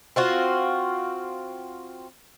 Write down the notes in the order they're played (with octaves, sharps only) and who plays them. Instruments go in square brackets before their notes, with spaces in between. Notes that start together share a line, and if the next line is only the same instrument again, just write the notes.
[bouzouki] C4 F4 F#4